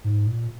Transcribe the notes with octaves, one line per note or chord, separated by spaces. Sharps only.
G#2
A#2